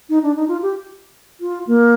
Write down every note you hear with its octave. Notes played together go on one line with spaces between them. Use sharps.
D#4
D4
D#4
F4
G4
F4
A#3